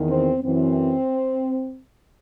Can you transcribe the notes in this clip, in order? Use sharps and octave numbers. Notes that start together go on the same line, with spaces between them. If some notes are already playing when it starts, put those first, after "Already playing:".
Already playing: E2 D#3
C4
F#2 E3 C4